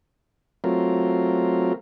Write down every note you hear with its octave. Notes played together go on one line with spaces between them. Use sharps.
F#3 A3 C4 F4 A#4